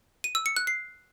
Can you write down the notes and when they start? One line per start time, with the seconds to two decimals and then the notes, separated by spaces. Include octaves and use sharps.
0.24 D#7
0.35 E6
0.46 C#7
0.56 F#6
0.67 C7